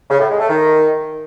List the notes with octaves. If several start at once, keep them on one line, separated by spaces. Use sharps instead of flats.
C#3
A2
G#3
A3
D#3